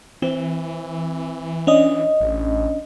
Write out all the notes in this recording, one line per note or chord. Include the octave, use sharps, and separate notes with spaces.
E3 C4
C#4 D4 D#5
A1